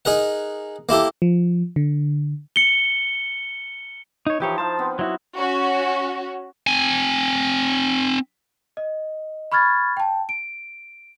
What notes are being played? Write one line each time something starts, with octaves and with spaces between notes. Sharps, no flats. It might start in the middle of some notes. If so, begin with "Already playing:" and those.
D#4 G#4 A#4 F#5
A#3 E4 G4 A4
F3
D3
C#7 G7
D#4 C#5
E3 F3 D#4 E4 G4 C#5
C5 F5 A5
B3 C4
F#3 E4 F#4
C#4 F#4
C4 G#5
D#5
B5 C#6 F6 G#6 A6
G5 A5
D7